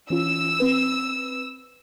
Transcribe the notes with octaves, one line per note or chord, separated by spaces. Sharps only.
E3 C#4 F4 E6
C4 B4